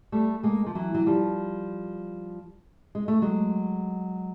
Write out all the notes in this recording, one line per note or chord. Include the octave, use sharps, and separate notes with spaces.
G3 A3
G#3 A#3
F3
E3 F#3
F#3
F3 G3
G#3
A3
F#3 G#3